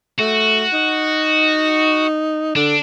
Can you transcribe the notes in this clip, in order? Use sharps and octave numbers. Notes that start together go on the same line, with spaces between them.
A3 F#4
D#4
D3 D4